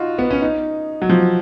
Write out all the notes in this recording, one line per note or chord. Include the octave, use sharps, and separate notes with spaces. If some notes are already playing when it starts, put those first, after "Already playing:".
Already playing: D#4 F4 F#4
B3
C#4
D#4
F#3
F3